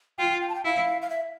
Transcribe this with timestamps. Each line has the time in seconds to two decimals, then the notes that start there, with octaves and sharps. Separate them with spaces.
0.18 F4 G5
0.41 G5
0.49 A5
0.55 G5
0.65 E4 F5
1.02 F5
1.10 E5